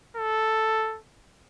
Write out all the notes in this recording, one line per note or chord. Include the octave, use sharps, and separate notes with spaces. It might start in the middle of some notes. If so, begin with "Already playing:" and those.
A4